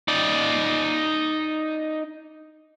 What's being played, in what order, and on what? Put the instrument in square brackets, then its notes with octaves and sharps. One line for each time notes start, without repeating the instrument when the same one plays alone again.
[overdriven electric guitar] D#4 D5